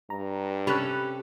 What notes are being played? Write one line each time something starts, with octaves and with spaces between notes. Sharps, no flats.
G2 A#5
C3 C#4 G4 A4 B5 F#6